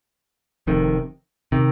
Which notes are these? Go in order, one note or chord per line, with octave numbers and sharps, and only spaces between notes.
F1 F2 C3 D#3
C3 D#3